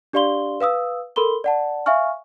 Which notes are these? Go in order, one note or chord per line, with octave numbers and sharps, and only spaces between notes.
D4 G4 D5 F5 C6 G7
B4 F5 D#6 E6
A4 A#4 B5 C6 G7
D5 F#5 A5
E5 F5 G#5 C#6 F6